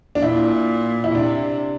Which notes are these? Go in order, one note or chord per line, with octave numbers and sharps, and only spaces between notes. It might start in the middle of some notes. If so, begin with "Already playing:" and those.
D4
A#2 E4
E4
C3 D4